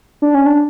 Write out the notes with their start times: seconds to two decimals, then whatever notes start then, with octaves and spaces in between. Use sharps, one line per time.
0.22 D4
0.34 C#4
0.46 D4